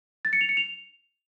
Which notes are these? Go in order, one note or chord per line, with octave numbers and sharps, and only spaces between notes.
A6
C#7
F7
C#7
F7